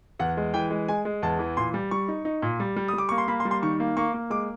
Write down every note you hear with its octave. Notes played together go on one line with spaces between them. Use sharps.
E2 F#5
G#3
E3 G5
G#3
G#3 G#5
G#3
E2 A5
E3
A#2 C6
G3
G3 C#6
D#4
D#4
A#2
G3
G3
D#6
G3 D6
A#3 C#6
C6
A#3 B5
C6
G3
C6
D#3 C#6
A#3
A#3 C#6
A#3
G#3 D6